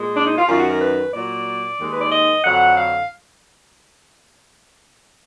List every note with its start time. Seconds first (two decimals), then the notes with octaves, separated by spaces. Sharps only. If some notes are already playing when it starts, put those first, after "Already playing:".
Already playing: A#2 G#3
0.17 D4
0.27 D#4
0.38 F4
0.48 F#2 D#3 F#3 F4
0.60 F#4
0.71 A#4
0.81 B4
1.14 A#2 F#3 D5
1.80 D#2 D#3 G#3
1.91 B4
2.01 D5
2.12 D#5
2.44 F2 D3 F#3 F#5
2.77 F5